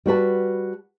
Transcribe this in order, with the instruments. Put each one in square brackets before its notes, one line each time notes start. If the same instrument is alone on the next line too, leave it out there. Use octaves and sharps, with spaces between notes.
[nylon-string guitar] G3 F#4 B4 A5